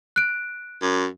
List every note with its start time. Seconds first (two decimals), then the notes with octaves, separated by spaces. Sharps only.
0.16 F#6 D7
0.82 F#2